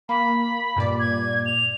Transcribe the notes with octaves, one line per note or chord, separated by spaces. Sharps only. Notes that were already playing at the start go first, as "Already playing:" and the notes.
A#3 B5
G2 A#2 D5
G#6
F7